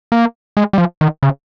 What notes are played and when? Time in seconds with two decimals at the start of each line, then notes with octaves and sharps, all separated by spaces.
0.12 A#3
0.57 G#3
0.73 G3
0.78 F3
1.01 D#3
1.23 C#3